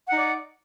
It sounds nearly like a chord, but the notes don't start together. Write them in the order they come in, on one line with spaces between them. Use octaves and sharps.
F#5 D#4 D5